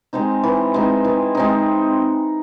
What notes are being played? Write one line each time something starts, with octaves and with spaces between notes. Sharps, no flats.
G#3 C4 D#4
E3
G#3 C4 D#4
E3
G#3 C4 D#4